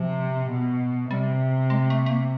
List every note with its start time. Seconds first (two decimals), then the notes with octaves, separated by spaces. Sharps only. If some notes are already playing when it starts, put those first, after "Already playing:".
Already playing: C3 F3
0.51 B2
1.11 C3 G3
1.70 G#3
1.90 A3
2.06 A3
2.10 A#3